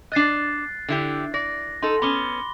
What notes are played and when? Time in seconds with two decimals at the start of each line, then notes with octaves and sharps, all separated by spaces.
0.12 D4 D#5 F#6 A6 C7
0.89 D3 E4 G4
1.34 D5 A#6
1.83 D#4 A4 C6
2.02 B3 C#4 B5 D6 G7